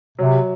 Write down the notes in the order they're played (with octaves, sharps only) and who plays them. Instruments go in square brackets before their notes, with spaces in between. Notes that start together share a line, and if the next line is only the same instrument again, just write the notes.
[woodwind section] C3 [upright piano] F#3